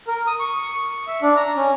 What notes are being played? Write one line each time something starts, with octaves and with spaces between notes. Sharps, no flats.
A#4
D#6
C#6
E5
D4
A#5
C#4